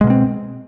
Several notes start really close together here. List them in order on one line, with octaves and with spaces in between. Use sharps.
G#3 B2 A#3 C4